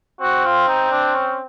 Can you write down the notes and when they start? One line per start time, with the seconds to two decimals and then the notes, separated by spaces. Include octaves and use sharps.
0.21 C4 F#4
0.45 F4
0.68 D#4
0.91 D4
1.15 C#4